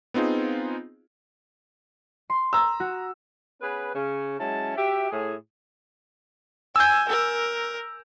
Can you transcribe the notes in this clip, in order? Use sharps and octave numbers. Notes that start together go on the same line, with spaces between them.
B3 C4 D#4 F4 G#4
C6
A#5 E6
F#4
B3 C#4 G#4 B4
C#3 C#4
F#3 G#3 C#4 E4 A5
F#4 G4 E5
A2 G#4
G#5 E6 G6
A#4